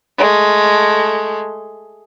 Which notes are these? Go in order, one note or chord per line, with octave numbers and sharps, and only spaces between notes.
G#3 A3